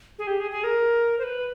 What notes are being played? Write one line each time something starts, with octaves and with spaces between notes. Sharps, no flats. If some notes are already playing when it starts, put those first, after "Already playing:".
G#4
G4
G#4
G#4
A#4
C5
B4